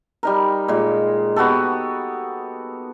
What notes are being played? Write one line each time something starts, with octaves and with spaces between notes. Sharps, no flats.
G3 D#4 A#4
A#2 G#3
B3 F#4 G4 A4